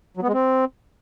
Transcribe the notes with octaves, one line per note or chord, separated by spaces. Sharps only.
F#3
B3
G#3
C4